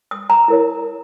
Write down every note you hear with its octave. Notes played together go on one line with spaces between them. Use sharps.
D#6
A#5
E4 A#4 C#5